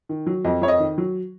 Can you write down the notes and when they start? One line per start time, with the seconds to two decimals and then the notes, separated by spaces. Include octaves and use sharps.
0.09 D#3
0.27 F#3
0.45 F2 D#5
0.62 F2 C#5
0.68 D#5
0.80 D#3
0.98 F#3